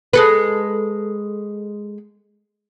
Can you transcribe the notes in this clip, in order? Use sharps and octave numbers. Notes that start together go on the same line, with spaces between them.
G#3 A4 B4